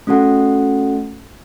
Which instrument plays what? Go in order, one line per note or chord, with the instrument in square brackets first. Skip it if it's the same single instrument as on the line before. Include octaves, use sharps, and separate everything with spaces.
[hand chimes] A3 C#4 F#4 A4 F#5